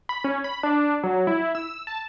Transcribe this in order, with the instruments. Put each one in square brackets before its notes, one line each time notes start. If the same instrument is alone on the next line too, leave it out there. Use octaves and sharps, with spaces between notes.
[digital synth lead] B5
C#4
B5
D4
F#3
E4
E6
A5